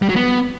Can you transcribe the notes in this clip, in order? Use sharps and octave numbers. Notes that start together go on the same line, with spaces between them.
G3
F#3
B3